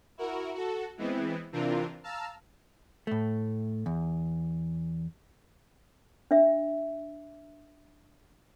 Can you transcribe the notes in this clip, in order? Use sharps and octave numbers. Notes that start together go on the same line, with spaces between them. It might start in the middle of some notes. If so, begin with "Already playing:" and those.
E4 F#4 A#4
F#4 A4
E3 G#3 B3 C4 E4
C3 E3 C4 D4 F4 A#4
F5 A5 A#5 E6
A2 A3
E2
D4 E5